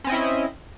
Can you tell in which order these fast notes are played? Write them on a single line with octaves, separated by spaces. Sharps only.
C#4 C4 D#5 E4